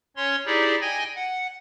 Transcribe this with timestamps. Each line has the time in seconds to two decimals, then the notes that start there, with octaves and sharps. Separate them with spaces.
0.16 C#4 C#5 C6
0.46 D#4 E4 G4 G#4 D5
0.81 D#5 G5 G#5 G#6 A#6
1.15 F#5